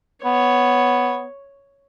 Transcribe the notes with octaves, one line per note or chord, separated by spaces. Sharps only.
B3 C#5